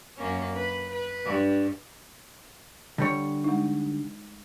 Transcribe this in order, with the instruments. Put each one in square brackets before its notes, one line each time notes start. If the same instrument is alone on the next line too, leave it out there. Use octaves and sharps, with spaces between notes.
[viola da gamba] F#2 A#3 C#4
B4
B4
G2
[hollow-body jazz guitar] D3 G3 C#5
[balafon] G#3 D#4